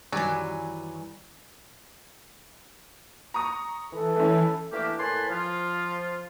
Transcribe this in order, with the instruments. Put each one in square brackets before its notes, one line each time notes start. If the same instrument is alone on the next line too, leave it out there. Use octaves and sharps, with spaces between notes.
[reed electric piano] F#2 D#3 G3 [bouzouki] E3 G#5 [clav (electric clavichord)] F#3 [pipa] D5
[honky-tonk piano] A#5 C#6 D#6
[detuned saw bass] E3 [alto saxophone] A4
[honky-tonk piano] A3 C#4
[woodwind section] E3 A3 A#3 D4 G4
A2 A#3 B4 G#5 A5 C6
F3 F4